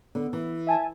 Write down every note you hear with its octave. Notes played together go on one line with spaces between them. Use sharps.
D3 B3
E3
E5 G#5 A5